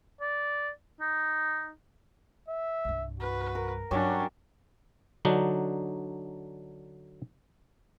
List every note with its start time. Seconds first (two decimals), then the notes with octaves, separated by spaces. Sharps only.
0.21 D5
1.01 D#4
2.48 E5
2.85 C2 G2
3.20 F#4 B4
3.55 A#4
3.91 G2 F#3 C#4 D4 G4 C#5 F#5
5.25 D3 F#3 D4 D#4